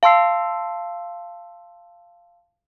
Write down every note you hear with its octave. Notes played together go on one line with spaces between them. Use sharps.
F5 A5 C6 E6 C7